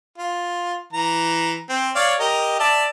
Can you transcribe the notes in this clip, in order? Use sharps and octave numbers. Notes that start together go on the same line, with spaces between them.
F4
E3 A#5
C4
C#5 D5 F5
G4 A#4 D#5
D5 E5 A5